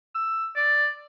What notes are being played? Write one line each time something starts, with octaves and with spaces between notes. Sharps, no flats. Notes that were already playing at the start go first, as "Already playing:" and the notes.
E6
D5